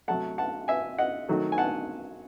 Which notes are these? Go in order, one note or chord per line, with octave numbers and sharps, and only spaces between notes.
C3 F#3 A3 F#5 A5
F#5 A5
E5 G#5
D#5 F#5
D#3 F#3 A3
G#5
F#5 A5